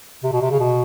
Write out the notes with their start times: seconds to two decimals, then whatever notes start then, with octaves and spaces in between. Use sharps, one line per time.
0.24 C3
0.32 B2
0.41 C3
0.51 C#3
0.60 B2